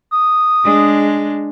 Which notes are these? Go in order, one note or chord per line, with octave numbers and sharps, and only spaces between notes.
D#6
G#3 D4